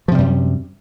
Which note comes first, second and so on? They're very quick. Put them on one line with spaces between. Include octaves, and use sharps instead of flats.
F3 C3 G3 F#2